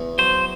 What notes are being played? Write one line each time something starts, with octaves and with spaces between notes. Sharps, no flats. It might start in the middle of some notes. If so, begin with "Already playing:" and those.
Already playing: E2
F#3 C5